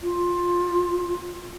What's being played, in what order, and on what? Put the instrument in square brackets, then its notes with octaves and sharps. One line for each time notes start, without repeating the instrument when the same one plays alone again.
[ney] F4